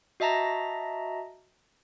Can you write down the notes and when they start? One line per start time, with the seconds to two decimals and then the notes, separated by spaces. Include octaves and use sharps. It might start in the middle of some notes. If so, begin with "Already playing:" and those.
0.20 F#4 D#5 E5 A5 A#5 A#6